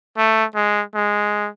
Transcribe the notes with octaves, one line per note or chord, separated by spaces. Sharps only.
A3
G#3
G#3